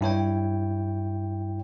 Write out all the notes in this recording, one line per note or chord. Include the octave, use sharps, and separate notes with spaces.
G2 E4 C#5 G5